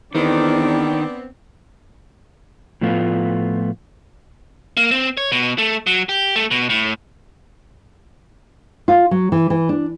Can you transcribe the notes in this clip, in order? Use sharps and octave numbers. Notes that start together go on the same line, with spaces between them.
E2 D#3 B3 C4 D4 D5
A2 F3 A3 B3 F4
A#3
C4
C#5
B2
A3
F#3
G4
A3
B2
A2
F4
F#3
E3
E3
D4